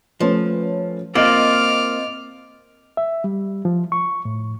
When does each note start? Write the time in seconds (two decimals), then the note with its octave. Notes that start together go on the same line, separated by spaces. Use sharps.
0.20 F3 A3 C#4 B4
1.15 A#3 C4 F4 D5 D#5 D6 F6 D7
2.97 E5
3.24 G3
3.65 F3
3.92 C#6
4.25 A2